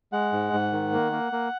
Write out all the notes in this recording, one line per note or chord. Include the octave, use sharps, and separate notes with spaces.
G#3 F#5
G#2
G#2
D#3
A#3
A#3
A#3